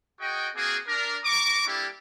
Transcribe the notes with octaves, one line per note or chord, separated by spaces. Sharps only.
F#4 G#4 D#5 G5
A#3 C4 F#4 G#4
D4 A#4
A#5 C#6 D6
G3 A#3 D4 E4 G4 A4